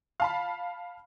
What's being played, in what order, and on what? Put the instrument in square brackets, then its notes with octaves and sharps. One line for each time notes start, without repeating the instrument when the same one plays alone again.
[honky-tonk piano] F5 A5 B5